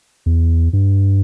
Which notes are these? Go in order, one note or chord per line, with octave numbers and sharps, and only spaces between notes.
E2
G2